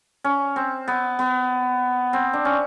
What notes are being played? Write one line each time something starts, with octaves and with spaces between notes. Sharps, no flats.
C#4
C4
B3
B3
C4
D4
C#4